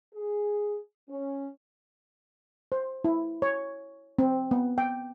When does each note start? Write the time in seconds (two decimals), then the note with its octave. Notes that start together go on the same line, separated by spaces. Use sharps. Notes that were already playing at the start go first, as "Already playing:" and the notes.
0.14 G#4
1.09 C#4
2.72 C5
3.04 E4
3.42 C#5
4.19 C4
4.51 B3
4.78 G5